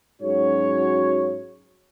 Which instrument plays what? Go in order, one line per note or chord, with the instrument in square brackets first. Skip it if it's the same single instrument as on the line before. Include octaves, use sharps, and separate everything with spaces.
[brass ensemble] G#2 F#3 C#4 F#4 C#5